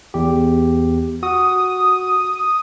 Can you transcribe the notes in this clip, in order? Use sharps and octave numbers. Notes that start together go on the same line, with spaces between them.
E2 G4
F#4 D#6